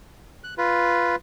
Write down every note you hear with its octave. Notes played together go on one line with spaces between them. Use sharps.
F#6
F4 B4